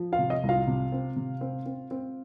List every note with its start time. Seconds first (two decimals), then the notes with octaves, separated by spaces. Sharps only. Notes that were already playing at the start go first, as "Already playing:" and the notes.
Already playing: F3
0.12 F4 F5
0.19 C3
0.30 D#5
0.43 C2
0.49 F4 F5
0.67 C3
0.92 C4
1.16 C3
1.41 C4
1.66 C4
1.91 C4